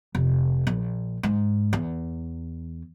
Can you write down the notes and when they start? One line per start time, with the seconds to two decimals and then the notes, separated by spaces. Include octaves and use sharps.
0.15 F1
0.67 A#1
1.23 G#2
1.73 E2